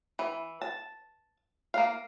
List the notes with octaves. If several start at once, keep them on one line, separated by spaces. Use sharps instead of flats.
E3
A5
A#3 F5